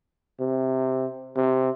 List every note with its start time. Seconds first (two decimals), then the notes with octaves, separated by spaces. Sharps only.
0.40 C3
1.36 C3